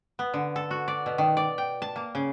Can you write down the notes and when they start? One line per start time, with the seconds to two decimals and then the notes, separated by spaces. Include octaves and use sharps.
0.19 B3
0.34 D3
0.56 A4
0.71 F#4
0.88 D5
1.06 B2
1.18 D#3
1.37 D5
1.58 G5
1.82 A5
1.96 A#3
2.15 C#3